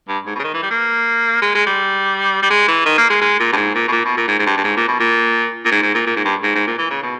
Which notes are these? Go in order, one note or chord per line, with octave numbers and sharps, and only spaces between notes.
G2
G#2
B2
C#3
D#3
E3
G3
A#3
G#3
G#3
G3
G3
G#3
E3
D#3
A#3
G#3
G#3
A#2
G2
G#2
A#2
B2
A#2
B2
A#2
G#2
G#2
G2
G2
G#2
A#2
B2
A#2
A#2
G#2
G#2
A#2
A#2
G#2
G2
G#2
G#2
A#2
E3
C#3
B2